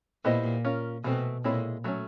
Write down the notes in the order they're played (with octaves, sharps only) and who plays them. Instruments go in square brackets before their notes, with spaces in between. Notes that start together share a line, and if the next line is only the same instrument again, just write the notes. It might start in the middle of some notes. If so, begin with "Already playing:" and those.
[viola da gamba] A#2 [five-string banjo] B3 E4 G4 C5 D#5
[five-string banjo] C#4 F4 A#4
[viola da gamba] B2 [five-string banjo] E3 A3 C4
[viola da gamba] A#2 [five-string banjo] G#3 C4 E4 A4 C#5
[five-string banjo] F#3 A3 C#4